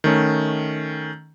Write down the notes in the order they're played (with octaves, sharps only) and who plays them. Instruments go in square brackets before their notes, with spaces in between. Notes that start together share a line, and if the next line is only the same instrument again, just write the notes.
[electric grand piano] D#3 A3 C#4